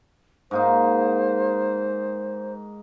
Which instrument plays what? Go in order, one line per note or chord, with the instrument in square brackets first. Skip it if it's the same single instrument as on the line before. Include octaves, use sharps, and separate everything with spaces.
[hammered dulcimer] G#2 A#3 D#4 [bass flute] C5